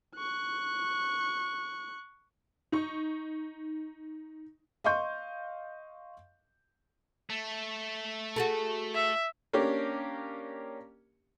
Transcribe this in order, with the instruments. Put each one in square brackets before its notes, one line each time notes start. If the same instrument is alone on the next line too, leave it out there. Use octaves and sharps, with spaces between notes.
[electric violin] C#6 F#6
[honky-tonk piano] D#4 C#6
[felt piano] D#5 F5 C6 C#6 G6
[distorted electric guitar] A3
[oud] F#4 G#4 A4
[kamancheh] E5
[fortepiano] A#3 C#4 D4 G4